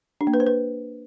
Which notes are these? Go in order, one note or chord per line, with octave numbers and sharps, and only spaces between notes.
D4
A#3
B4
C5
B4